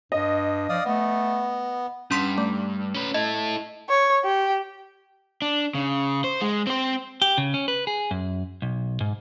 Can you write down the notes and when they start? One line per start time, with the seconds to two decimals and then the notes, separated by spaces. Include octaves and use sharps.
0.12 G2 D#5
0.69 F3 D5 F5 D#6
0.85 A3 B3
2.11 G2 C#4 C6 B6
2.38 A3
2.94 C#4 B4
3.14 E4 A4 D#5
3.89 C#5
4.24 G4
5.42 D4
5.75 C#3
6.24 C5
6.42 G#3
6.67 C4 C5
7.22 G4
7.38 C#3
7.54 C#4
7.68 B4
7.87 G#4
8.11 F#2
8.62 B1
9.01 G#2